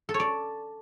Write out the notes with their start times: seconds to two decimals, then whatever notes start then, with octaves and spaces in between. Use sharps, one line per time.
0.09 A4
0.14 C#5
0.20 D5